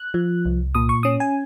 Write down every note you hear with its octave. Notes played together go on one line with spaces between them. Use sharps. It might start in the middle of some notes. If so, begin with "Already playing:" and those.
Already playing: F#6
F3
C2
A#2 D#6
C#6
C#4 D#6
G#5